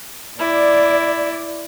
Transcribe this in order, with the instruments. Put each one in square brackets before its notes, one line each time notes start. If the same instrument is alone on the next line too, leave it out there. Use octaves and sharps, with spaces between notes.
[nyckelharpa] E4 [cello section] D5